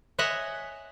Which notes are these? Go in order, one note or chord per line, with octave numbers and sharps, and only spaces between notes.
C#5 D#5 E5 F#5 G#5